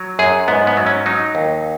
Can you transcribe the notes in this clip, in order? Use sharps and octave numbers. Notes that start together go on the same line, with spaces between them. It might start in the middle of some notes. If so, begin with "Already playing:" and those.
Already playing: F#3
F#2 G#4
G#2 B3
B3
F#3
C#4
F#3 D#4
D#2